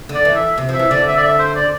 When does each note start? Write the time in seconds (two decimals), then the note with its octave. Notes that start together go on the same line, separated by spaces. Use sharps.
0.09 D3
0.14 D5
0.25 E3
0.36 E5
0.58 C3
0.69 F3
0.74 E5
0.79 E3
0.90 D3 D5
1.07 E5
1.17 D5
1.23 E5
1.39 C5
1.56 D5